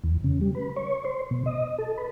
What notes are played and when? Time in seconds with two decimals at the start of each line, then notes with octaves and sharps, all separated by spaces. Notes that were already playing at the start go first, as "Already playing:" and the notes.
0.04 E2
0.24 C#3
0.41 G3
0.55 B4
0.76 C#5
1.05 C5
1.31 B2
1.46 D#5
1.78 A4
1.98 B4